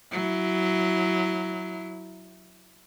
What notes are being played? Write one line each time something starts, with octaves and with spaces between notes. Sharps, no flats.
F#3 E4